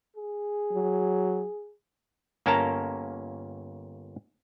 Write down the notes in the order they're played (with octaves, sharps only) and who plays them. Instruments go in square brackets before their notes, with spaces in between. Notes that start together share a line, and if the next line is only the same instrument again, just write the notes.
[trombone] G#4
[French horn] F#3
[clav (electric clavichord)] G1 A#3 C#4 A#4 A5 A#5